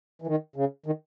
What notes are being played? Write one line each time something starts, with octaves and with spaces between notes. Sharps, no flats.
E3
D#3
C#3
D#3